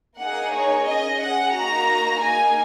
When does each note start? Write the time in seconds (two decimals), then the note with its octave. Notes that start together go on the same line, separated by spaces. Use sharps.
0.22 A#3 D#4 G#4 F#5
0.56 C#5
0.88 C#4 G#4 D#5
1.22 F#5
1.55 A#3 D#4 F#4 A#5
2.22 A#3 D#4 G#4 G#5